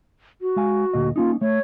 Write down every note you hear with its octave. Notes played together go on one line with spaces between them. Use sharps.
F#4
G#3 F5 G#5
D2 A#2 D#5
A#3 C#4 D#4 F4
A3 C#5